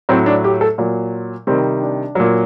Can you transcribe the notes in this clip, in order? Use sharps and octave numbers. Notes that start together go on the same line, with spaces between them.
A2 F#3 C4
D4
G4
A4
A#2 F#3
C3 D#3 G3 C4
D4
A#2 F#3